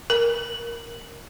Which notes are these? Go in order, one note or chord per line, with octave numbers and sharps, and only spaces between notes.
A#4